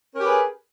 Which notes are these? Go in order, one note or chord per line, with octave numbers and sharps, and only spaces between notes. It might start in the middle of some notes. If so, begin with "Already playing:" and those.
C#4 G4 G#4 A#4 B4